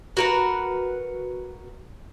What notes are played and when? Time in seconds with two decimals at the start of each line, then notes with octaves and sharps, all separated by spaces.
0.17 F#4 A#4 B4